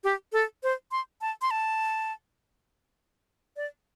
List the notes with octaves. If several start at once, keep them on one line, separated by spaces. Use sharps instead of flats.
G4
A4
C5
C6
A5
C6
A5
D5